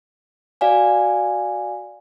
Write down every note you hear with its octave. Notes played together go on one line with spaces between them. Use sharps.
F#4 D5 F5 G#5